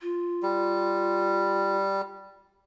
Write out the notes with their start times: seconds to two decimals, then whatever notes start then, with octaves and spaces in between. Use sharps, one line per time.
0.01 F4
0.43 G3